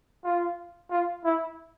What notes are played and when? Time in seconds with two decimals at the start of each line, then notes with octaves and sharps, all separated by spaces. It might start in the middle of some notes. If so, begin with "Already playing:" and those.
0.24 F4
0.90 F4
1.25 E4